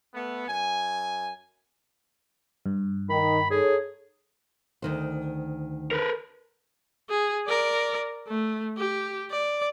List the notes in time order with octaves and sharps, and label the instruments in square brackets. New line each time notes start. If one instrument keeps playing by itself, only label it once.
[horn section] A3 B3
F#2 G#5
[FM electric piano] G2
[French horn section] D#3 [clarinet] B5
[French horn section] D#4 A4 C#5 [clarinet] G#4
[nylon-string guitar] D2 D#3 C5
[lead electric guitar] A#4 B4
[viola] G#4
A#4 D5
A3
G4
D5